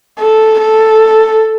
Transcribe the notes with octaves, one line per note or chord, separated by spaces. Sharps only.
A4
A4